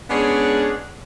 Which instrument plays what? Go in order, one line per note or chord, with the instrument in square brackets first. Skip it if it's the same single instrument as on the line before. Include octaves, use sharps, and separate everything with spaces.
[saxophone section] G#3 B3 C#4 D4 G#4 C#5